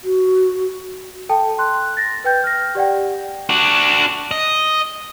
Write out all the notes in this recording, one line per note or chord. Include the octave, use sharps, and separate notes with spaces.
F#4
A4 G5 A5
C6 F#6
A6 A#6
B4 G5 G6
F6 A#6
G4 D5 F#5 G5
D4 F#4
D#5